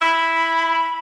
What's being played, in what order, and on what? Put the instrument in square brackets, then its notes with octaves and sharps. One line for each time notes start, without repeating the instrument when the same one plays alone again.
[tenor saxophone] E4 [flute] B5